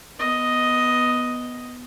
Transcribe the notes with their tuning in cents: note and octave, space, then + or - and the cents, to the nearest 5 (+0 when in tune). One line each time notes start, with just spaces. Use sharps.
B3 +0 D#5 +5